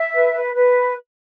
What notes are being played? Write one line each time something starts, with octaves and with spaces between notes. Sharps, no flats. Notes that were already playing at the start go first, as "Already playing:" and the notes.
Already playing: E5
B4
B4
B4